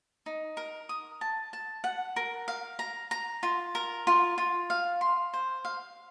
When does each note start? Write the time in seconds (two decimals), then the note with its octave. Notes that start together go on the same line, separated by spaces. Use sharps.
0.26 D#4
0.57 A#4
0.89 D#6
1.21 A5
1.53 A5
1.84 F#5
2.16 A#4
2.48 F5
2.79 A#5
3.11 A#5
3.43 F4
3.75 A#4
4.07 F4
4.38 F4
4.70 F5
5.01 C6
5.34 C5
5.65 F5